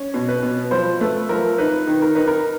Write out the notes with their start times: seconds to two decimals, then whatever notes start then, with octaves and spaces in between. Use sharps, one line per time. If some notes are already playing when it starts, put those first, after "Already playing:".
Already playing: C#4
0.14 B2
0.29 B4
0.43 B2
0.71 F3 C5
1.01 A3 B4
1.29 F3 A#4
1.58 D#4 B4
1.87 D#3
2.02 A#4
2.15 D#4 B4
2.28 A#4